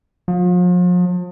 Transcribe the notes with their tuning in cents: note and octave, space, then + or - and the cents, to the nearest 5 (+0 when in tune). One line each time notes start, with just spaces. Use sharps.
F3 +40